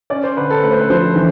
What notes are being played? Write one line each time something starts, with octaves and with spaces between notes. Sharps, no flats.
C#4 D5
C5
D3 B4
A4
A3 B4
C5
B4
F3 C5
E3